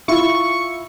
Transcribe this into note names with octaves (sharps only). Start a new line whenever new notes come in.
E4 F4 E5 C#6